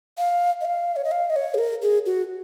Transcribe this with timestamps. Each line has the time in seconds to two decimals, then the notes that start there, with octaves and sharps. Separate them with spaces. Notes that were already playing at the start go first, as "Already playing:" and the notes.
0.18 F5
0.61 D#5
0.65 F5
0.96 C#5
1.04 D#5
1.11 F5
1.30 D#5
1.36 C#5
1.54 G#4
1.58 A#4
1.82 G#4
2.06 F#4